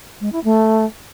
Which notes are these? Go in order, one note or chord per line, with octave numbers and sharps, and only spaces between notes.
G#3
E4
A3